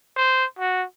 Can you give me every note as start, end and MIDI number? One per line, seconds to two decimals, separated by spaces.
0.17 0.46 72
0.59 0.84 66